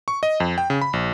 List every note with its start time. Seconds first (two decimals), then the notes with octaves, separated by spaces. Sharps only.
0.08 C#6
0.23 D#5
0.40 F2
0.58 G5
0.70 C#3
0.81 B5
0.93 A#1